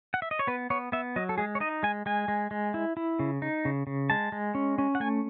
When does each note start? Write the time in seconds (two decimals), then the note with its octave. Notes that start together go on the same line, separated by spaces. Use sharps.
0.14 F#5
0.22 E5
0.31 D#5
0.39 C#5
0.47 B3 B4
0.70 B3 C#5
0.92 B3 E5
1.16 F#3 D#5
1.29 A4
1.38 G#3 G#4
1.55 C#5
1.60 D#4 D#5
1.83 G#3 G#5
2.06 G#3 G#5
2.28 G#3
2.51 G#3
2.74 E4
2.97 E4
3.19 C#3
3.42 D#4
3.65 C#3
3.87 C#3
4.10 G#3 A5
4.32 G#3
4.55 C#4
4.78 C#4
4.95 F#5
5.00 A3 G#5